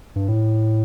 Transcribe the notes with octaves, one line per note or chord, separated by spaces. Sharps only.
G2
A2